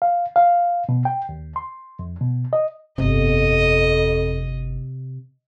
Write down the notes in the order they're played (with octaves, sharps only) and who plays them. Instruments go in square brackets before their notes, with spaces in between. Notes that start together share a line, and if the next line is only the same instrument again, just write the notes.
[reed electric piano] F5
F5
B2
G5
D#2
C6
F2
B2
D#5
[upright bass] G1 B3 [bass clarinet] F2 [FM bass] C3 [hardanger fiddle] D#5